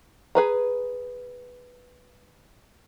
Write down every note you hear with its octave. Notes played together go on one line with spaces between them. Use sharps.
G#4 B4 A#5